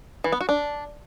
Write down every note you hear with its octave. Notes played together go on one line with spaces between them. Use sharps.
E3
B3
F#4
D4